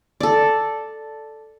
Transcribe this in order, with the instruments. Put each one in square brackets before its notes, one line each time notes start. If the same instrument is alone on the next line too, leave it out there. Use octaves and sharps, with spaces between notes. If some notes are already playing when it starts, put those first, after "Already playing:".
[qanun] A4 D5